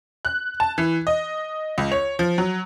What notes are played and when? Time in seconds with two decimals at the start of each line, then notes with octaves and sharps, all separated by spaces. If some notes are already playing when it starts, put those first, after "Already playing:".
0.25 F#6
0.60 A5
0.78 E3
1.07 D#5
1.78 C#2
1.92 C#5
2.19 F3
2.38 F#3